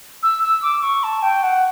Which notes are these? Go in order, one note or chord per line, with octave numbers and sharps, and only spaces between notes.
E6
E6
D6
C#6
A5
G5
F#5